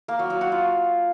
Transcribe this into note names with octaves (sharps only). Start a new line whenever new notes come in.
A#3
F#3
F#3
F#4
F4